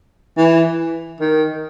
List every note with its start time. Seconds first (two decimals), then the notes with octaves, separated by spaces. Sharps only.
0.38 E3
1.20 D#3